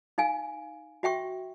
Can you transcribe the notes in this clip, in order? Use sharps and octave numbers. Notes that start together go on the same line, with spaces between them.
D#4 F5 G#5
F#4 E5 G5 C#6